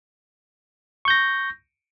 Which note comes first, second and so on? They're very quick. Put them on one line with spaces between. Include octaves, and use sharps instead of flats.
C#6 G6 A#6